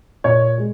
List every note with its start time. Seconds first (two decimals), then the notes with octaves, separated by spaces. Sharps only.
0.24 A#2 C#5
0.58 G#3